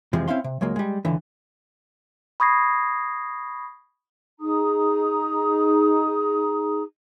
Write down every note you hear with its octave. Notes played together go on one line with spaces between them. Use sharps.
F2 C3 E3 F3 G#3
C4 C#4 E4 F5 C6
C3
C#2 F#3 G#3 A#3
G3 G#3
C#2 D3 E3
B5 C#6 D#6 G#6 A#6 C7
D#4 G#4 A#5 D#6